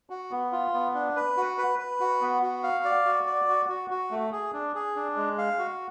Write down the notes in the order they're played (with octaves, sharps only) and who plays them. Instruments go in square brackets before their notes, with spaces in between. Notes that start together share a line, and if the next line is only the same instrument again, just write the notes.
[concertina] F#4
B3
F4
B3
D4
B4
F#4
B4
B4
F#4
B3
F#4
F5
D5
F#4
D5
F#4
F#4
F#4
A3
G#4
D4
G#4
D4
G#3
F5
F#4